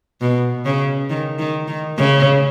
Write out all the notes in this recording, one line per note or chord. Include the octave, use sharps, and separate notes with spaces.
B2
C#3
D#3
D#3
D#3
C#3